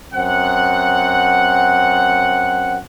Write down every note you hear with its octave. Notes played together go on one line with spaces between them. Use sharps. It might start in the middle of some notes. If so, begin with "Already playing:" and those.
F#2 C4 F#5